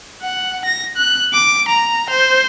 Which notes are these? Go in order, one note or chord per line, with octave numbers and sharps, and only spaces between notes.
F#5
A#6
F#6
D6
A#5
C5